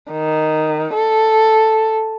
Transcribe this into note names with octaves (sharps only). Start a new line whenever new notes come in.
D#3
A4